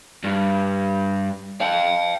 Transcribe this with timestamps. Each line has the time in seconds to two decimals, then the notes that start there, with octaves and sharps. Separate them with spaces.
0.24 G2
1.61 F5 G5